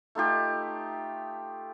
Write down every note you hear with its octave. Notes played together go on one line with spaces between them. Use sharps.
A3 D#4 F4 G4